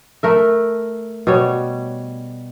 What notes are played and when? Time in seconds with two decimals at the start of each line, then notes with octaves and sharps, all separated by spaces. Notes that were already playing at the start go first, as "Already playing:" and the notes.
0.23 A3 A#4 E5
1.27 B2 G3 C#5